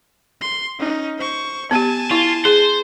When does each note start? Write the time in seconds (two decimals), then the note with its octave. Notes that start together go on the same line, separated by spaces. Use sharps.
0.41 C6
0.79 C#4 D#4
1.18 C5 C#6
1.71 B3 G4 G#5 A5
2.11 E4 F4
2.45 G#4 C5